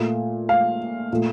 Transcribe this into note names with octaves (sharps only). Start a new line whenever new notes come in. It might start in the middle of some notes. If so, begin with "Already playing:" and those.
Already playing: A#2 A3
F5
A#2 A3